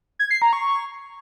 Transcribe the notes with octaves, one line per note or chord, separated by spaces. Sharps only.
G#6
C7
A#5
C#6